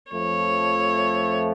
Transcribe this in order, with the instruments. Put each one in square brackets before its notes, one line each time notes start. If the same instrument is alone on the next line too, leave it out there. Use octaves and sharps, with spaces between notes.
[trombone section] F2 F3 A3 [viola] C#5